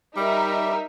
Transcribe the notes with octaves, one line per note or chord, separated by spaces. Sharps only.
G3 D#4 A#4 E5